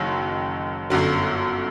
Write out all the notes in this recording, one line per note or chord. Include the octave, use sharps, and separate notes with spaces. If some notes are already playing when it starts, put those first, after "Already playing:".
Already playing: F#1 F#2 D#3 F#3
G1 F#2 D3 F#3